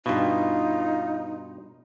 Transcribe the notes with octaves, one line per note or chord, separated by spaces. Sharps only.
G2 B2 D#4 F4